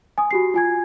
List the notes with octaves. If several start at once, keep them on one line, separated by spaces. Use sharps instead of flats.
G#5 D#6
F#4 G4 C7
F4 G#5 G#6